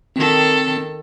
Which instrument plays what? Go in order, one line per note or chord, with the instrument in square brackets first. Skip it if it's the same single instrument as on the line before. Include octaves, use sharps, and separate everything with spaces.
[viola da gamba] D#3 A4 [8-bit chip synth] C4